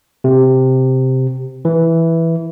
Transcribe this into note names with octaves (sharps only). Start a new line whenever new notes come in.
C3
E3